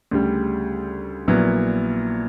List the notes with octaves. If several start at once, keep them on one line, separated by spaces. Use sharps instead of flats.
D2 C#3 G3
A#1 A#2 F#3 B3 E4